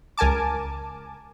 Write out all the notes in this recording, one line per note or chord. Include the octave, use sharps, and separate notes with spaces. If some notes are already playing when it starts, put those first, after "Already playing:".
C#2 A#4 G#5 A5 D6